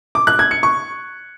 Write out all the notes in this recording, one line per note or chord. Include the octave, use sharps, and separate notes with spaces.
D6
F#6
G#6
C#7
C#6